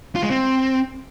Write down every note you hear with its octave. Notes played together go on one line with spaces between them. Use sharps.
F4
G#3
C4